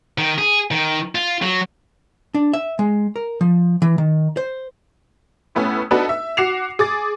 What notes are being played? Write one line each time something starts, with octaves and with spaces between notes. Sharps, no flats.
D#3
G#4
D#3
F4
F#3
D4
E5
G#3
A#4
F3
E3
D#3
C5
A2 A3 B3 C#4
B3 D4 D#4 F#4 A4 B4
E5
F#4 F#5 D6 C7 E7 F7
G#4 D6 A6